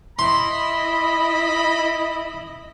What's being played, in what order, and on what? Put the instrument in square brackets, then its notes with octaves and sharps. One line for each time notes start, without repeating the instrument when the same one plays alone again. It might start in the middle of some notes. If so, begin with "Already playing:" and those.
[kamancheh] E4 D#5 [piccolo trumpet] B5 [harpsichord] C6